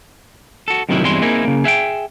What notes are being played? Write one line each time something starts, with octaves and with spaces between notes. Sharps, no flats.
F#4 A4
F#2 A2 C3 D#3 F#3 E4
E2 G2 C3 G#3 E4 C6
A#3 C4 D#4 E4 G#4 A#4
C#3 A#3
G#4 E5 F#5 G5